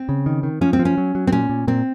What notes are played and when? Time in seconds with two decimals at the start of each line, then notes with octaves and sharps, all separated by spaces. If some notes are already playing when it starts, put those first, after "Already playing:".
Already playing: C4
0.09 C#3
0.26 D#3
0.43 D#3
0.61 F3 C#4
0.73 C4
0.79 F3
0.85 C#4
0.98 F#3
1.15 F#3
1.27 C4
1.32 A#2 C#4
1.49 A#2
1.67 A#2 C4